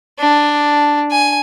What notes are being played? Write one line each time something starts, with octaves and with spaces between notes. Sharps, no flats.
D4
G#5